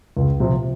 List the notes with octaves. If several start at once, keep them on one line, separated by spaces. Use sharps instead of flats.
C#2
C3 F3